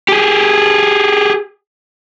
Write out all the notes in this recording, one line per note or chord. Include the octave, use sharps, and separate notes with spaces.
G4 G#4